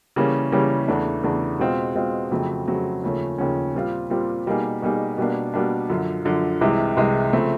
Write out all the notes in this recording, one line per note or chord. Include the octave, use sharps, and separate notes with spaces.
C#3 E3 G3 A#3 C#4
C#3 E3 G3 A#3 C#4
E2 C#3 E3 A3 D4
E2 C#3 E3 A3 D4
B2 G#3 C4 F4
B2 G#3 C4 F4
F2 C#3 F#3 A3 C4
F2 C#3 F#3 A3 C4
D#2 C#3 F3 A3 C#4
D#2 C#3 F3 A3 C#4
A#2 G3 C4 F4
A#2 G3 C4 F4
B2 G3 A#3 D#4 G#4
B2 G3 A#3 D#4 G#4
B2 G3 A#3 D4
B2 G3 A#3 D4
F#2 D3 F3
F#2 D3 F3
C2 C3 E3 G#3
C2 C3 E3 G#3
C#3 F3 A3 C4